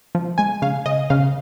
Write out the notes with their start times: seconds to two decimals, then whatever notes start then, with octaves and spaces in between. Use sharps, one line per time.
0.15 F3
0.38 G#3 G#5
0.62 C#3 F5
0.86 C#3 D#5
1.10 C#3 F5